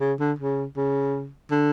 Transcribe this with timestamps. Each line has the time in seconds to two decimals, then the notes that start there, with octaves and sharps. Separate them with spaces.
0.01 C#3
0.20 D3
0.39 C#3
0.77 C#3
1.51 D3